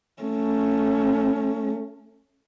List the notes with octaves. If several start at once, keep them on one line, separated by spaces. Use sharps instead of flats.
A3 C#4